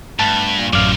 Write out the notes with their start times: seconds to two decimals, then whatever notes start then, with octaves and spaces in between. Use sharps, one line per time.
0.19 G2 A3 B3 A5
0.59 A#2
0.73 A1 F#2 A2 C3 D5 F5